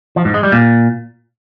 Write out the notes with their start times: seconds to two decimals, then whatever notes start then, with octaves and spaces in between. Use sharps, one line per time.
0.16 F3
0.25 G#2
0.34 G#3
0.43 G3
0.52 A#2